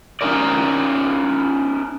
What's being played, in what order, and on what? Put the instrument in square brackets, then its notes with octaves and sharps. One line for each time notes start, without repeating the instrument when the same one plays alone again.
[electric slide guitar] C#4 D#4 E4 A#4 D5